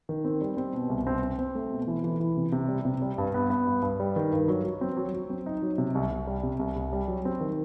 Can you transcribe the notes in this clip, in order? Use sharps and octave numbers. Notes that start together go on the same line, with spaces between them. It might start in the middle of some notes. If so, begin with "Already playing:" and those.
D#3
C4
G3
C4
B2
C2
C4
C4
C4
A3
B2
E3
E3
E3
C3
C3
G3
C3
G3
G2
B3
B3
G2
G2
G3
D#3
G2
F#3
F#3
C4
F#3
F#3
C4
D#4
F#3
C3
C2
C2
G3
C3
C2
C2
G3
F#3
C4
D#3